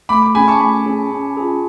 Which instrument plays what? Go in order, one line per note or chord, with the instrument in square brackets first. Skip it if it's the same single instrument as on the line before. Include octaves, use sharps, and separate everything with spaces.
[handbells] A3 [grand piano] B5 D6
[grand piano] B5 D6
[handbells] C#4 G#4 [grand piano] G#5 B5
[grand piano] A5 C#6
[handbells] A3 [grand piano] G#5 B5
[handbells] C#4 G#4
C#4
F4 G#4